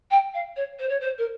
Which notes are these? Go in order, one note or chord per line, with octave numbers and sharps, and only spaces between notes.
G5
F5
C#5
C5
C#5
C5
A#4